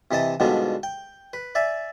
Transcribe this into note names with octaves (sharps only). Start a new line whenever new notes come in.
C3 E3 D#5 A5 D#6
G#2 B2 D3 F3 G3 B3
G5
B4
D5 E5 G#5